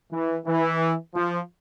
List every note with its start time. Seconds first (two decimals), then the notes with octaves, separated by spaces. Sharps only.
0.12 E3
0.46 E3
1.15 F3